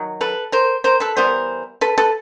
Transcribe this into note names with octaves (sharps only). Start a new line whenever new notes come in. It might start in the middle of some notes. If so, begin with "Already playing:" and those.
Already playing: D#3 F#3
A4 B4
A#4 C5
A#4 C5
A4 B4
E3 G3 B3 A#4 C5
A4 B4
A4 B4